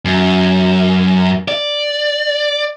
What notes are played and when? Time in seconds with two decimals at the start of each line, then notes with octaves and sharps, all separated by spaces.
0.05 F#2
1.48 D5